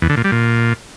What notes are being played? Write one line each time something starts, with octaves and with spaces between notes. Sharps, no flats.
E2
D3
A#2
G3
A#2